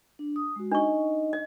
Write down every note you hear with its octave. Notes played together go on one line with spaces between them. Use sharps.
D4
D#6
G#3 F#4
D4 D#4 D#5 C#6
D#5